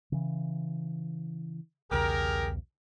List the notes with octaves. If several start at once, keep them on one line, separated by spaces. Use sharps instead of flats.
C#3 E3
B1 E2 C#3 G4 G#4 A#4